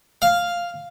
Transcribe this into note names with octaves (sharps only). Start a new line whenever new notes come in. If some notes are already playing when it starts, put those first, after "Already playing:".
F5